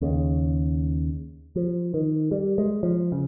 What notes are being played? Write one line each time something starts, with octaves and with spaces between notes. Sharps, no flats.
D#2 C#3
F3
D#3
G3
G#3
F3
C#3